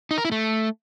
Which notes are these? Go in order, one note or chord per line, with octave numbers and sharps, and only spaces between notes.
D#4
A#4
E4
A3